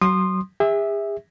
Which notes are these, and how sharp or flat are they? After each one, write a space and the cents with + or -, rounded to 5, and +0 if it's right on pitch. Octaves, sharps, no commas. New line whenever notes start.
F#3 +20 C6 +10 D#6 -25
G#4 -40 E5 -10